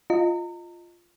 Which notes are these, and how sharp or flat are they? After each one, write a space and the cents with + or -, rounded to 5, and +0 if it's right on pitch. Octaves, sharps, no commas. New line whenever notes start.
F4 +0 D#5 +0 A#5 -35